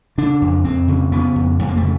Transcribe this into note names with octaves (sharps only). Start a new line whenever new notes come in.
C#3 D4
F2
F2 C4
C#3
C#3 B3
F2
F2 A3
A#3
A3
C#3